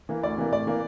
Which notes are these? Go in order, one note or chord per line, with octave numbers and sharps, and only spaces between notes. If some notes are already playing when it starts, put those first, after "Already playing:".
E3 A#3
D2 D5
C3 E3 A#3
A2 D5
E3 A#3